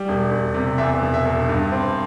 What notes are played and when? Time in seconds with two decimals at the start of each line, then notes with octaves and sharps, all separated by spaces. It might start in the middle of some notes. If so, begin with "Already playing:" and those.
Already playing: G3
0.08 E1
0.31 E1
0.54 C3
0.78 E2 E5
1.02 E1
1.14 E5
1.25 E1
1.49 G2
1.72 C4